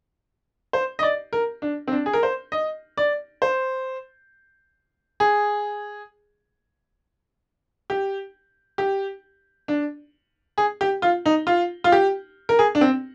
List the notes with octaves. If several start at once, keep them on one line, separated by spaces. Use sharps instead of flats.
C5
D#5
D5
A#4
D4
C4
D4
G#4
A#4
C5
D#5
D5
C5
G#4
G4
G4
D4
G#4
G4
F4
D#4
F4
F4
G4
A#4
G#4
D4
C4